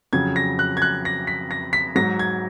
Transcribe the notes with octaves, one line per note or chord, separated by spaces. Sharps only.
F2 C#3 F#3 G#6
A#6
F#6
G#6
F#6
A#6
B6
A#6
B6
G#2 F#3 A#6
G#6